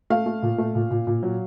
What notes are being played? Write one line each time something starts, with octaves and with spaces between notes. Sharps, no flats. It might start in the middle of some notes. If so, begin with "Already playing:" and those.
A3 F5
A3
A#2
A3
A#2
A#2
A#2
F#3